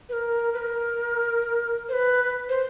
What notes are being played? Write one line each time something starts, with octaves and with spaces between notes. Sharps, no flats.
B4
A#4
B4
A#4
C5
B4
C5